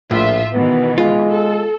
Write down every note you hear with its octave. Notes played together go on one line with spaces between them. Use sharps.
A#1 A2 F4 E5
B2 D#3 E3 B3
G#3 F4
A4